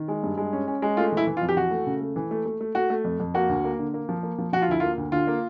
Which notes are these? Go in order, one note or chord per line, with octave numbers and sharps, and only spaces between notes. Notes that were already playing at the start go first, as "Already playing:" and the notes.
Already playing: D#3
G#3
G2
G#3
C#4
C#4
G#3
A3 F4
E3
E4
E3
F4
F2
G4
E3 F#4
A3
C#3
A3
E3
A3
A3
A3
A3 F#4
A3
F2
F2
A#3 F#4
D2
A#3
D3
A#3
F3
A#3
F3
F3 F#4
F4
D2 E4
A#3 F4
D2
D3 F4
A#3